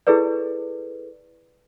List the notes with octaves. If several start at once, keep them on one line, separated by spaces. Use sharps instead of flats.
E4 G#4 A4 B4 D5